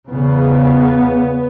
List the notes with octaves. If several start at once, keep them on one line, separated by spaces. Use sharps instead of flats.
E2 C#3 B3